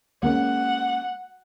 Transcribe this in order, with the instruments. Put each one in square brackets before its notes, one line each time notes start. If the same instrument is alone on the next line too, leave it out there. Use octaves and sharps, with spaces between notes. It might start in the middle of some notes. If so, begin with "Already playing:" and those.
[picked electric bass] G#3 A#3 C#4 [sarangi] F#5